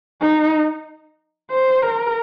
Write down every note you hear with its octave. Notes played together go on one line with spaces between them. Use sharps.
D#4
C5
A#4